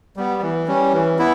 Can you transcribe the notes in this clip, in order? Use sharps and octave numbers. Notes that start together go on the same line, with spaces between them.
G3 B3
E3
G3 C#4
E3
B3 E4